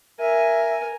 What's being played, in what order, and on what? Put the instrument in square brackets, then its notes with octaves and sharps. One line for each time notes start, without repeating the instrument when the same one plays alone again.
[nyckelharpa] A#4 G#5 [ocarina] E5